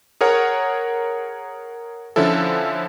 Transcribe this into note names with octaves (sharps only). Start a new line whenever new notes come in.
G#4 A#4 C#5 F#5
D3 F3 C#4 E4 A4